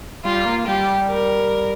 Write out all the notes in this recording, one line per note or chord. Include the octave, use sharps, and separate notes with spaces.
G3 F4
A#3
G3 G4
A#4